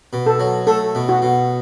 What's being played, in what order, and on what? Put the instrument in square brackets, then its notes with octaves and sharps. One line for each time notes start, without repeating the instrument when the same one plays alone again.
[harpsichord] B2
[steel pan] A4
[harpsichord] F#3
[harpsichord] A3 [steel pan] A4
[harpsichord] B2
[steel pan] F#4
[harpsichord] B2